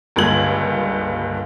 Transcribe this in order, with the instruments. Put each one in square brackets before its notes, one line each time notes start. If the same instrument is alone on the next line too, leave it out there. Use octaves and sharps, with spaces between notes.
[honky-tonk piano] C#2 G2 D3 A#3 G#6 F#7